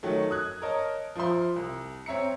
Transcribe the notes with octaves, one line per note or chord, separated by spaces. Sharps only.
D#3 F#3 A3
D#6 F#6 G#6
A#4 C#5 D#5 A5
F3 F4 C5 E5 C6
C2
C4 C#5 E5 A#5 C#7